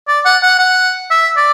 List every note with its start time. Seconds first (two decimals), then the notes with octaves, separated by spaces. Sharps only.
0.08 D5
0.25 F#5
0.43 F#5
0.59 F#5
1.11 E5
1.37 D5